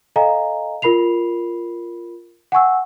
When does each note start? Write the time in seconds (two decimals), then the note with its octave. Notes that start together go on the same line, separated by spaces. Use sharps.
0.16 A4 D#5 F5 G#5 A#5
0.82 F4 A#4 B5 C7 F7
2.52 F#5 G#5 C#6 E6